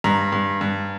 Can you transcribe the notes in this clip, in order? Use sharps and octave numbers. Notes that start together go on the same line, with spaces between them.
G2 A#5
G2
G2